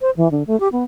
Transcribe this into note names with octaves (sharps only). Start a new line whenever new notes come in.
C5
E3
D3
A3
G4
B3